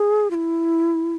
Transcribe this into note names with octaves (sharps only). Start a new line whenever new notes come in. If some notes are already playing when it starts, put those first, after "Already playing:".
Already playing: G#4
F4
E4